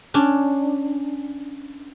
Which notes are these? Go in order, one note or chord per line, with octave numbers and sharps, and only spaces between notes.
C#4 D4